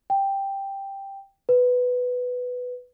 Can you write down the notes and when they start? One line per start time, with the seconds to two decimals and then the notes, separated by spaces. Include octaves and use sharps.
0.10 G5
1.49 B4